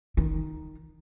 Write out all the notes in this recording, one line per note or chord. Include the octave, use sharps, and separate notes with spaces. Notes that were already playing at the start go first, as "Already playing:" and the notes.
D#3